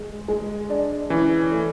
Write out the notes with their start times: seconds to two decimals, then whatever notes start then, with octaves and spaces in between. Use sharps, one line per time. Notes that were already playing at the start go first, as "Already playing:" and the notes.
Already playing: G#3
0.28 G#3
0.70 D4
1.10 E3 C#4
1.52 A3